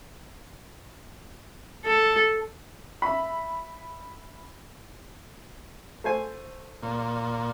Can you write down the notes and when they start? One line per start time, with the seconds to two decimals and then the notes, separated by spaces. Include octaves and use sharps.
1.85 A4
3.02 E5 B5
6.04 A3 C5 G#5
6.83 A#2